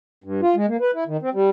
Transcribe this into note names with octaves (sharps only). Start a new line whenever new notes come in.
G2
F4
G#3
A#3
B4
E4
D#3
C4
G3